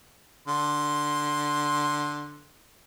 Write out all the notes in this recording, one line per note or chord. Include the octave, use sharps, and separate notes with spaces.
D3 C6